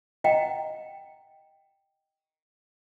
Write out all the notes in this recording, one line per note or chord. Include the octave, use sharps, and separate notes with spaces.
D#5 F#5 G5 A#5